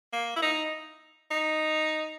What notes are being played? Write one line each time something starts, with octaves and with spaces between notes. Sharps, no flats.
A#3
E4
D#4
D#4